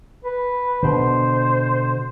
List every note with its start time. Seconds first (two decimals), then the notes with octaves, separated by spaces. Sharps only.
0.25 B4
0.83 B2 D3 C5